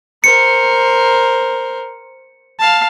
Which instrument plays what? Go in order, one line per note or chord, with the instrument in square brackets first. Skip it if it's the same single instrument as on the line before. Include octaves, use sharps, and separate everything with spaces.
[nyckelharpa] A#4 C5 [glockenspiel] C#7
[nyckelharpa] F5 A5